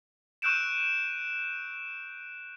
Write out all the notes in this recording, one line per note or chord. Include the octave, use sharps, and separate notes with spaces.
C#6 E6 F#6 G6 D7 E7